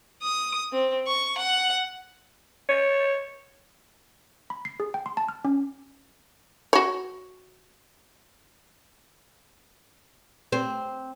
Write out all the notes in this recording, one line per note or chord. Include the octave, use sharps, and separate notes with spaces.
D#6
C4
C#6
F#5
C#5
B5
C7
G#4
G5
C6
A5
F6
C#4
F#4 C#5
C4